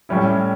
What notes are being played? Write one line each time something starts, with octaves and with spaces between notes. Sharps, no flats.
A2 G3 C#4 E4